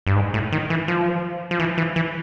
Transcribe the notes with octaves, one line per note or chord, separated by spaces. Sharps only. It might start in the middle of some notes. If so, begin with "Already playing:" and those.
G2
G#2
A2
D#3
E3
F3
F3
E3
E3
E3